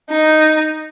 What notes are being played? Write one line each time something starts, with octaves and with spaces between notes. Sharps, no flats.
D#4